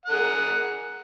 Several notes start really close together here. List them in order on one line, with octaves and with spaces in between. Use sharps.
F#5 A#4 G#4